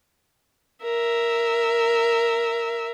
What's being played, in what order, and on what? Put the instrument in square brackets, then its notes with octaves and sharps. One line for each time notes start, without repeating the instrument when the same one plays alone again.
[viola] A#4 E5